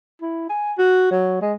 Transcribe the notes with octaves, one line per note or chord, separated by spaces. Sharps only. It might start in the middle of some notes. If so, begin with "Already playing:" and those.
E4
G#5
F#4
F#3
G#3